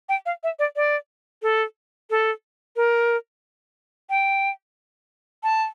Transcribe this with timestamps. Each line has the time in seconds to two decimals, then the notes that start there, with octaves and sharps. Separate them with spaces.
0.09 G5
0.26 F5
0.43 E5
0.59 D5
0.76 D5
1.42 A4
2.10 A4
2.76 A#4
4.10 G5
5.43 A5